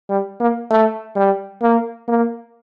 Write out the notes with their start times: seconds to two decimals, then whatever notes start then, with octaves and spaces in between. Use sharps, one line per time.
0.09 G3
0.40 A#3
0.70 A3
1.16 G3
1.62 A#3
2.08 A#3